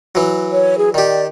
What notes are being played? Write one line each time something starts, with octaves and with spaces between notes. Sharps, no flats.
E3 F#3
C#5
G#4
D#3 G4 D5